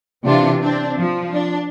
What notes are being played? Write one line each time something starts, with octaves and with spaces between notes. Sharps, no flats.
C3 E3 C4 D4 F4
C4 D4
F3
D4